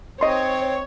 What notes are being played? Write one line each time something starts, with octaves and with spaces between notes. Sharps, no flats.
C4 C#5 D#5 C6